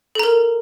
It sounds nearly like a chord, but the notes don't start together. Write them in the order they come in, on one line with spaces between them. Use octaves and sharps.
A4 A#5 A#4